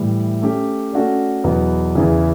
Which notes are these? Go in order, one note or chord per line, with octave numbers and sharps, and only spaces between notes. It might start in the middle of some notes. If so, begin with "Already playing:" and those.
Already playing: A2 E3 G3
A3 C#4 G4
A3 C#4 F#4 A4 D5
E2 B2 F#3 B3 F#4
E2 C#3 E3